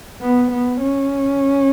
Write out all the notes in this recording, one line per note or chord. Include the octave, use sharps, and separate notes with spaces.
B3
B3
C#4